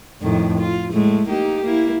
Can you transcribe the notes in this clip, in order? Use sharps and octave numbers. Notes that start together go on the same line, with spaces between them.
F2 A2 D#3
F4
A2 G#3 A3
A#3 D#4 G4
A#3 E4